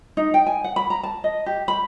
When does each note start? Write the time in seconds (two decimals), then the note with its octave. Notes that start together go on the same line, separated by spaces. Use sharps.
0.17 D#4
0.34 G5
0.46 G#5
0.64 F#5
0.76 B5
0.90 A#5
1.03 A5
1.24 D#5
1.46 G4
1.68 B5